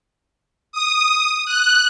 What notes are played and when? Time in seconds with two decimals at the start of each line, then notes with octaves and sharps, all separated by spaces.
0.72 D#6
1.46 F#6